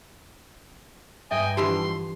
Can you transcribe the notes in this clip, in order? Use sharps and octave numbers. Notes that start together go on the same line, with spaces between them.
G2 D#5 E5 G5 G#5
D3 E3 F3 G4 C6